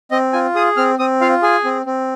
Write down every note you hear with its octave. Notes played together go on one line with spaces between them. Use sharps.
C4 D#5
F4 G#5
G#4 D#6
C4 F6
C4 D#6
F4 F5
G#4 G#5
C4
C4